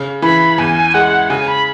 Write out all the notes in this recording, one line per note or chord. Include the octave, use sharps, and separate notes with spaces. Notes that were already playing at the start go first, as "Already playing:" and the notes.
Already playing: C#3
E3 B5
E2 G#5
G#3 F#5
C#3 G#5
B5